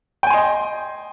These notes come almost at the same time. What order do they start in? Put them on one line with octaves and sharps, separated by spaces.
G5 G#5 C6 D#5